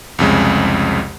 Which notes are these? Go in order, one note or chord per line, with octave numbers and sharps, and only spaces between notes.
C2 F2 C#3 G#3